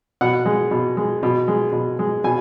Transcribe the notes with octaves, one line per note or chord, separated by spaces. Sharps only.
B2 F#5
G#3
B2
G#3
B2
G#3
B2
G#3
B2 G#5